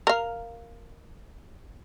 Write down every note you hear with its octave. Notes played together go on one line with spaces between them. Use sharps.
A#4 F5